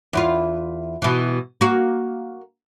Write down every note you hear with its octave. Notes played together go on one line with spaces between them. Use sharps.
E2 E4 F4
B2 E3
A#3 F#4